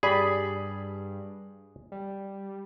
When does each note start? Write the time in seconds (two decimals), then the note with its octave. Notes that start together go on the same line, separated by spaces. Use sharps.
0.03 G2 G4 G#4 D5 B5
1.92 G3